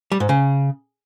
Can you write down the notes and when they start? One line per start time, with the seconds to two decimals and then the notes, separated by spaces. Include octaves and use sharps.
0.12 G3
0.20 G#2
0.29 C#3